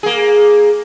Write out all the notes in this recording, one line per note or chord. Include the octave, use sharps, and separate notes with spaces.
A#3 G#4